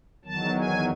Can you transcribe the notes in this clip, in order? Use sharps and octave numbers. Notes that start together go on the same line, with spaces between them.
E2 D#3 F#3 A5
G#5